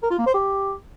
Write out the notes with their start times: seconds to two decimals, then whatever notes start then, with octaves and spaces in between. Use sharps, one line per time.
0.03 A#4
0.10 F4
0.18 A#3
0.26 C5
0.34 G4